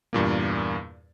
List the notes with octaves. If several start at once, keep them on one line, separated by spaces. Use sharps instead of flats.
E2 G2 A#2 A#3